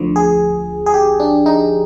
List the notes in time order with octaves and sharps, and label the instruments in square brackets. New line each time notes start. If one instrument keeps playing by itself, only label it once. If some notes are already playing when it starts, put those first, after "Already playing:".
Already playing: [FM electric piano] D2 D3 F3
G#4
G#4
G4
D4
D#4